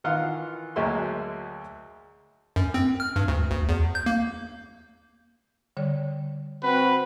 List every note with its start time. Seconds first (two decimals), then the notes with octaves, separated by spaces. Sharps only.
0.04 D#3 E3 F4 F#5 F6
0.76 D2 F#3 G#3 A#3 E5 C6
2.56 F#2
2.74 C4
3.00 F6
3.16 G2
3.28 D2
3.51 D2
3.69 E2
3.95 G6
4.06 A#3
5.77 D3 G3 C#5
6.63 C4 F#4 B4